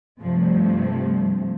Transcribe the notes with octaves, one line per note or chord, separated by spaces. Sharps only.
G2 C3 F3 A3